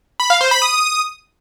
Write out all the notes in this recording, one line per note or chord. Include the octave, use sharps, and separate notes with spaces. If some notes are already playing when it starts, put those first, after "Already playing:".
B5
F5
C5
B5
D#6